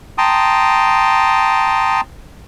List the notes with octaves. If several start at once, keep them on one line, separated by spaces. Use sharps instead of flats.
G5 A5 A#5 C6 D#6